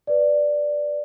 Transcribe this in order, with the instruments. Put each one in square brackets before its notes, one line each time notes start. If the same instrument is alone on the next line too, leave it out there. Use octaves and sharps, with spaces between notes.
[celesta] B4 D5